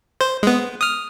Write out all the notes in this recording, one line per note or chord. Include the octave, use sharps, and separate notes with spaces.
C5
G#3 B3
D#6 F6